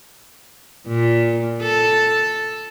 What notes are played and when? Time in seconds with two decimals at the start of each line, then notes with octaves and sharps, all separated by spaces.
0.88 A#2
1.62 A4